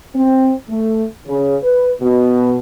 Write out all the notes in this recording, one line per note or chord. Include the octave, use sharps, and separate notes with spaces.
C4
A3
C#3
B4
B2